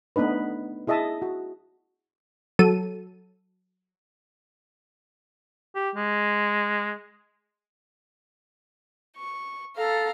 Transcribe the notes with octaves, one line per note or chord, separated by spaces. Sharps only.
A3 B3 D4 D#4 B4
E4 G#4 D#5 E5 A5
F#4
F#3 A4 D#7
G4
G#3
C#6
A4 F5 A#5